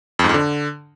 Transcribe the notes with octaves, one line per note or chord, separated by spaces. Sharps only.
F2
G#2
F2
D3